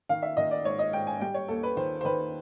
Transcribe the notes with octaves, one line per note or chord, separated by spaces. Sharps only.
D#3 F5
E5
D#3 D#5
D5
G#2 C#5
D#5
G#2 G5
G#5
G3 G5
C#5
D#2 A4
B4
D#3 C5
C5
D#3 B4